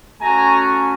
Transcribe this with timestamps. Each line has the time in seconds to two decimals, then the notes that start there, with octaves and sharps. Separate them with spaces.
0.21 A3 C#4 F#4 G#5 A#5